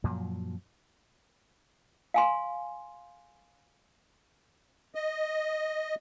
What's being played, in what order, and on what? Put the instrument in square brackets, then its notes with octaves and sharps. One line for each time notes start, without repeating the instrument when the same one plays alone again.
[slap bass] F#2 A#2 F3 F#3
[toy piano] F5 G#5 C6
[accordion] D#5